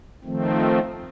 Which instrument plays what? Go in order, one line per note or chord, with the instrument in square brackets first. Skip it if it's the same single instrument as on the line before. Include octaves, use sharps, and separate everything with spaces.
[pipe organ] D#3 F3 A3 C4